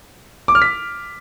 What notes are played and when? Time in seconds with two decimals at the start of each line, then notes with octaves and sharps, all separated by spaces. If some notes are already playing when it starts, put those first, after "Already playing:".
0.48 D6
0.55 F6
0.62 B6